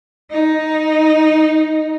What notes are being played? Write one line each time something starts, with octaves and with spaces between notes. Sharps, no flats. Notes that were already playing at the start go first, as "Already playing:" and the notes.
D#4